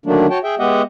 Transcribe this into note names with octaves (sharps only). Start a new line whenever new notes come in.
D3 D#3 F#3 A3 A#3 D4
F#4 C#5 G5 A5
G#4 E5 G5
G#3 B3 G4 D#5 E5 F#5